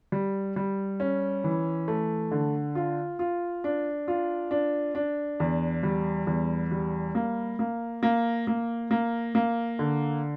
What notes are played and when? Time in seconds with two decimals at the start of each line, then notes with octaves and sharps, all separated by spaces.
0.12 G3
0.56 G3
1.00 C#4
1.44 E3
1.88 A3
2.31 D3
2.75 F4
3.19 F4
3.64 D4
4.08 F4
4.51 D4
4.95 D4
5.40 E2
5.83 G3
6.27 E2
6.71 G3
7.15 A#3
7.59 A#3
8.03 A#3
8.47 A#3
8.91 A#3
9.35 A#3
9.79 D3